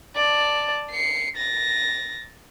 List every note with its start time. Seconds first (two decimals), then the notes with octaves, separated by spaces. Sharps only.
0.16 D5 A5
0.90 C7 C#7
1.37 A6 A#6